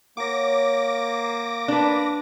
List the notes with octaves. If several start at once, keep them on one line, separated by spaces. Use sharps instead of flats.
A#3 C#5 F#5 D6 A#6
D4 B4